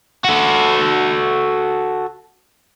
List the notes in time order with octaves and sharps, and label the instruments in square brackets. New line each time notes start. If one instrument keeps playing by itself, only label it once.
[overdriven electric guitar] F#4 A4